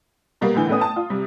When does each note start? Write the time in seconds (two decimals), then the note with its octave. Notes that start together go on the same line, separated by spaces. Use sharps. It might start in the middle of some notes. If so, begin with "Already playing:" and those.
0.41 B2 G3 A#3
0.55 A2 D3 E3
0.68 A2 A3 B3 C#4 D#6
0.81 A5
0.96 F4
1.10 C3 G3